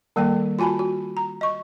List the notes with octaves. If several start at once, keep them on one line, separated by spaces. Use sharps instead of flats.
D#3 G3 A#3 A4 G5
F4 F#4 G#5 A5 B5
F#4
A#5
D#5 C#6